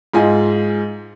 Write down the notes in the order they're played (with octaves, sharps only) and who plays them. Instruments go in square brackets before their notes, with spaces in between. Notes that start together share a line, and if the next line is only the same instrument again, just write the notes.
[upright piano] G#2 F4 D#5 G#5